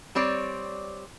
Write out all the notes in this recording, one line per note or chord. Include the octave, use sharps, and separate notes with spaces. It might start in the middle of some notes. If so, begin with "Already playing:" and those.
G3 C4 C#5 D5